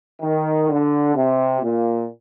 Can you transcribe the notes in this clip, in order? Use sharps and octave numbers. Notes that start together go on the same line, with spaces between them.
D#3
D3
C3
A#2